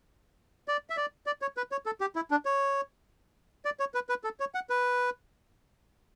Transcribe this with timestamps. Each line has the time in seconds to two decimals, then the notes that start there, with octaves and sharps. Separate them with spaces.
0.68 D5
0.90 E5
0.97 D5
1.26 D5
1.42 C#5
1.57 B4
1.72 C#5
1.86 A4
2.01 G4
2.16 E4
2.31 D4
2.45 C#5
3.65 D5
3.80 C#5
3.94 B4
4.09 B4
4.24 A4
4.40 C#5
4.55 F#5
4.70 B4